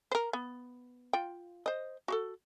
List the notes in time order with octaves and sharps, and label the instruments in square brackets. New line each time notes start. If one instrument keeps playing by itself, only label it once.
[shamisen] A#4 C5
B3
F4 G5
C5 D#5
F#4 G#4 A4